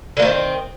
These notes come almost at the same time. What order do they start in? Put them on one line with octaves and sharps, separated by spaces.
D3 A#3 D#3 C4